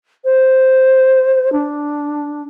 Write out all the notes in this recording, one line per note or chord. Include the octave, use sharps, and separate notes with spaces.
C5
D4